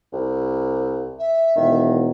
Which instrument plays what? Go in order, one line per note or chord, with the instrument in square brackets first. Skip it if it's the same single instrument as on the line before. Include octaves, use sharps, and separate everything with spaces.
[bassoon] C2
[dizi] E5
[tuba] E1 [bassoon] D#3